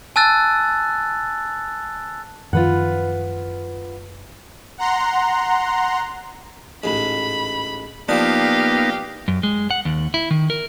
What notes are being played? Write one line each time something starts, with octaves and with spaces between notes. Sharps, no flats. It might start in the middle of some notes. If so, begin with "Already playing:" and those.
G#5 A5 E6 F#6 A6
F#2 D#3 F3 F4 B4 F#5
F#5 A#5 C6
A1 G#2 B5
F3 A#3 B3 D4 D#4 G4 F5
F#2
G#3
F#5
D#2
E4
D#3
A#4